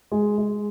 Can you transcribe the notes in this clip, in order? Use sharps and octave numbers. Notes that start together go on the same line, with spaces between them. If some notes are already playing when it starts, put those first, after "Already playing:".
G#3
G#3